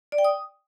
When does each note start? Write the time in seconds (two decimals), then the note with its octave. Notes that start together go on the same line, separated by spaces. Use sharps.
0.12 D5
0.18 G5
0.25 D#6